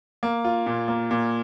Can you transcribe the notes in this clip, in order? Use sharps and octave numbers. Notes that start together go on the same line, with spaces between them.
A#3
F4
A#2
A#3
A#2